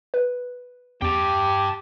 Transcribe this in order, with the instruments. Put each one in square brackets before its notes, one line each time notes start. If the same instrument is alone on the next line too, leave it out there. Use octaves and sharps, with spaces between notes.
[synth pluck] B4
[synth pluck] E2 [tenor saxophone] G4 [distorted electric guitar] G5 A5